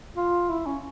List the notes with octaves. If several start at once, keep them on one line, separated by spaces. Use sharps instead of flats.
F4
E4
C#4